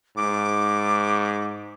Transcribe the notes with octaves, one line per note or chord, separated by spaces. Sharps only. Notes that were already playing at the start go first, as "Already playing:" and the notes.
G#2 D6